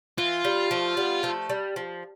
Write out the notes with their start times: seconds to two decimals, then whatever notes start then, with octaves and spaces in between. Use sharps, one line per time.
0.18 E3 F4
0.44 G3
0.71 F3 A3
0.97 G3 B3
1.23 F3 A3
1.49 G3
1.76 F3